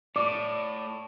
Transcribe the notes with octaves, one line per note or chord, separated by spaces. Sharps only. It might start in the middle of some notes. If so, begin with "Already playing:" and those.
A2 D5 D6